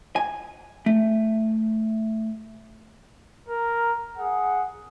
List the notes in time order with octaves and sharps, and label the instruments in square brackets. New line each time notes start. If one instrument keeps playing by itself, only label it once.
[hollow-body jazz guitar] G#5
A3
[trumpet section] A#4
G#4 F#5